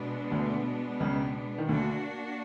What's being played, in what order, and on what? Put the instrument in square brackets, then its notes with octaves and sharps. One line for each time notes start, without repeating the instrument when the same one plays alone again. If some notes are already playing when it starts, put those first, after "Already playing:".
Already playing: [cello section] B2 G#3 B3 D4
[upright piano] D2 D3
C#2 C#3
D#3
[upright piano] D2 D3 [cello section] A#3 D4 F#4